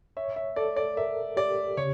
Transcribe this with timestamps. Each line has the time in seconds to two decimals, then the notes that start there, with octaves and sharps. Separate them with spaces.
0.17 C#5 E5
0.36 E5
0.56 A4 D5
0.76 D5
0.97 A#4 E5
1.37 G4 D5
1.77 C#3 C#5